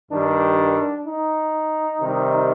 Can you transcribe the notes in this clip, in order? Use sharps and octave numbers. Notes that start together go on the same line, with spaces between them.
G2 D#3 G3 D4
D#4
C3 D#3 G3